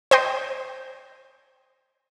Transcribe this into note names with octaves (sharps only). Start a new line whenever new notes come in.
C5 D#5 G5 C6